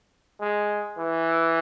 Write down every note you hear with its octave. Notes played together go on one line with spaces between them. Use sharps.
G#3
E3